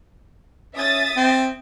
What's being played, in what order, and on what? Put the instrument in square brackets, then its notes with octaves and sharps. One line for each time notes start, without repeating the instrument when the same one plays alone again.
[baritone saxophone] C#4 [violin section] E5 D#6 A6
[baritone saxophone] C4